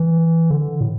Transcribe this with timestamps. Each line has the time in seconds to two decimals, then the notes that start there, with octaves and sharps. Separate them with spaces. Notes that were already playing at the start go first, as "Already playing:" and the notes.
Already playing: E3
0.51 D3
0.81 A2